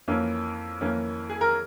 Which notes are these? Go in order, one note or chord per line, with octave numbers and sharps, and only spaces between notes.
F2 E3 A#3 C#4
F2 E3 A#3 C#4
G#4
A#4